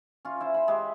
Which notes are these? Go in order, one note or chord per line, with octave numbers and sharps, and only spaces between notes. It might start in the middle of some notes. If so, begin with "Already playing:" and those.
C#4 F4
E4 C5
C5 B5
G#3 G4 E5